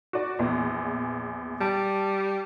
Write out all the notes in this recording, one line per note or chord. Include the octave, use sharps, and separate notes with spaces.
F#4 D5
A#1 E2 E3
G3 A5